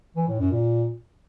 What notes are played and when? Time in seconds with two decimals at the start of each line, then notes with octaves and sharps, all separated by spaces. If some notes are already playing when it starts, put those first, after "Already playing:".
0.16 E3
0.28 A2
0.39 F#2
0.51 A#2